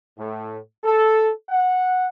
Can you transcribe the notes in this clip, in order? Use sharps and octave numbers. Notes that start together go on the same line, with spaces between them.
A2
A4
F#5